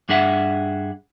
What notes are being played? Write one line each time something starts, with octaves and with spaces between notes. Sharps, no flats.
G2 D4 G#4 E5 F#5